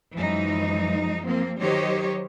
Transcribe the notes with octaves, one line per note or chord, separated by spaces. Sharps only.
F#2 E3 F3 G#3 D#4
F3 A#3 C4
D#3 F#3 G4 C5 C#5 D#5